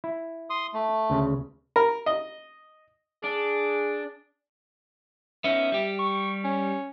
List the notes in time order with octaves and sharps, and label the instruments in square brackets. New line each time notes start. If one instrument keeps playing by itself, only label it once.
[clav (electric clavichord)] E4
[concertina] C6 D#6
A3
[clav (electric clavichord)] D2 C#3
[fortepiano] A#4
D#5
[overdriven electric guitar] D4 [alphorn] G#4 [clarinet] D6
[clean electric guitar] B3 C#4 D#4 [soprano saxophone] E5
[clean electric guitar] G3 G4
[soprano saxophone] C#6
C#4